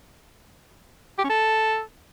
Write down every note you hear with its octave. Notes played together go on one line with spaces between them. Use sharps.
G4
C#4
A4